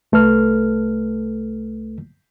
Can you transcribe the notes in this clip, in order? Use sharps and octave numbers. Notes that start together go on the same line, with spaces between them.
C2 A3 A4 B4 F6